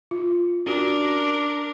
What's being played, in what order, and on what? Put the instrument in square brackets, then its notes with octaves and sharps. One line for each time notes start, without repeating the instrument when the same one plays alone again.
[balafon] F4
[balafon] C#4 F#4 [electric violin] D4 A#4